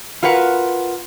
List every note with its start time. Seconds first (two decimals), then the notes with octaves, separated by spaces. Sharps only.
0.23 F4 F#4 A#4 B4 F#5